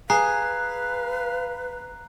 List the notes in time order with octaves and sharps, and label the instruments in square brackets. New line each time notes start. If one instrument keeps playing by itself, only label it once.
[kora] G#4 [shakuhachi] B4 [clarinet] F5 [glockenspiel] A#5 F#6 C7